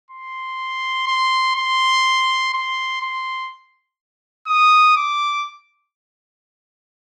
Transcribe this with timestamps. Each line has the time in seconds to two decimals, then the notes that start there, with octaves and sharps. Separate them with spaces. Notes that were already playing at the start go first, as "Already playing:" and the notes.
0.11 C6
1.07 C6
1.56 C6
2.54 C6
3.01 C6
4.47 D#6
4.96 D6